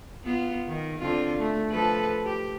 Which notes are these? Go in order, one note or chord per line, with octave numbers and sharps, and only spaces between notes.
B3 F4
D#3
D3 C4 F4
A3
F3 A4 B4
G4